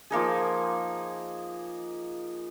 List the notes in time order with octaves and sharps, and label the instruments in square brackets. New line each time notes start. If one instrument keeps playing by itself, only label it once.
[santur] F3 A#3 D#4 G#4